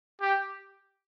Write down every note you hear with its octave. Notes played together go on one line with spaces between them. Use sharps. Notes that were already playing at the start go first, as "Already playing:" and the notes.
G4